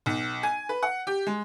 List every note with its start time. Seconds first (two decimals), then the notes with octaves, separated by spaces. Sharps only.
0.06 B1
0.43 G#5
0.69 B4
0.82 F#5
1.07 G4
1.27 G#3